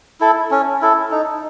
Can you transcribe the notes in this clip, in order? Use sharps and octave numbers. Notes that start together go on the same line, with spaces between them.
E4 A4
C#4
E4 A4
D#4